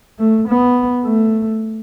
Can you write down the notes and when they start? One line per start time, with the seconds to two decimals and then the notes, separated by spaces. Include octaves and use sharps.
0.19 A3
0.48 B3
1.05 A3